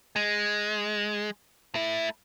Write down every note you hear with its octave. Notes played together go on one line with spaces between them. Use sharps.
G#3
A3 E4